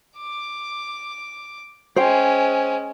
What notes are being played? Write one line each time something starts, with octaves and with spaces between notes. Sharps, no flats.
D6
G#3 C#4 C5 G5